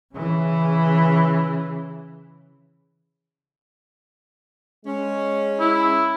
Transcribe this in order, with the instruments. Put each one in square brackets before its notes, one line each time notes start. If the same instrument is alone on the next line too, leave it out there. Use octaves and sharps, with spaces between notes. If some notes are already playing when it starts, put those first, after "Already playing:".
[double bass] C#3 E3
[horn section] G#3 C#4
[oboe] E4